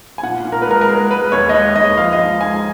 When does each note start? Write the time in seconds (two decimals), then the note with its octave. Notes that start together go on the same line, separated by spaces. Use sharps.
0.18 G#5
0.23 A#2 F#5
0.45 A#2
0.52 A#4
0.62 B4
0.67 G#3 A#4
0.81 A#4
0.88 G#3
1.11 G#3 B4
1.32 D#2 C#5
1.49 D#5
1.54 G#3 C#5
1.75 D#2 D#5
1.97 F3 F5
2.13 D#5
2.19 G#2 F5
2.41 G#2 G#5